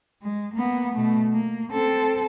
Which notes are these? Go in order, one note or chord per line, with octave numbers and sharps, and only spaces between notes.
G#3
A#3 B3
B2 A3
A#3
C4 A4